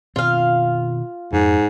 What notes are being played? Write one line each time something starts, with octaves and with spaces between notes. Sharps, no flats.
B2 D#3 C4 F4 F5
F2 G#2